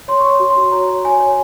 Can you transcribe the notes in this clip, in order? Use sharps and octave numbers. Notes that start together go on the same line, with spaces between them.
C#5 C6
C#6
C#5
C6
F#4
C6
F#4
C#5 A#5
C#5
C#5 G#5
C#5